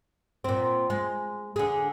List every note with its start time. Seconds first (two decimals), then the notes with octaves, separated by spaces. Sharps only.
0.44 A#2 C4
0.90 G#3
1.56 D3 G#4